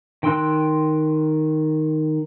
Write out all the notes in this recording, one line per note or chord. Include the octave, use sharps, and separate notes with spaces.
D#3 G5 C6 E6 F#6